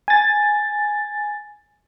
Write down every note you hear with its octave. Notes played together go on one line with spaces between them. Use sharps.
G#5 A6